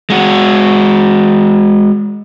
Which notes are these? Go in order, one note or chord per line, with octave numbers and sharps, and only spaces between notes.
G#3 F#4